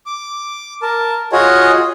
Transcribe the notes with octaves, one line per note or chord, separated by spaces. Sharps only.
D6
A#4 A5
F4 F#4 G#4 C#5 D#5